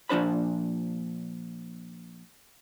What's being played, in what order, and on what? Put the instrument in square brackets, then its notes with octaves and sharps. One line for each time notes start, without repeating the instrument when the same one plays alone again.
[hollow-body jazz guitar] A#2 F3 D4 C5 B5